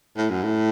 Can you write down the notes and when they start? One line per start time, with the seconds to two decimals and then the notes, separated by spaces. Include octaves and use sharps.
0.16 A2
0.30 F#2
0.43 A2